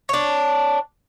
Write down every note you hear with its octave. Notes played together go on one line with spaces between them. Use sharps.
D4 C#5